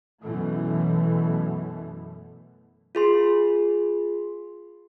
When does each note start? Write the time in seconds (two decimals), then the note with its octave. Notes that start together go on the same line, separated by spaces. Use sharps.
0.22 F#2 B2 E3 A3
2.95 F4 G#4 C6